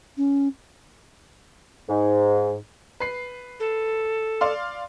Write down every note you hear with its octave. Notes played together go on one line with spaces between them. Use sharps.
C#4
G#2
B4 C7
A4
D5 F5 C6